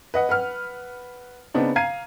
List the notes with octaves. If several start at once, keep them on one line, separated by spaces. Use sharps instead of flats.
B4 D#5 F#5
B4 F#5 F6
C#3 B3 C4 D4 D#4
F5 A#5 G#6 C7 D#7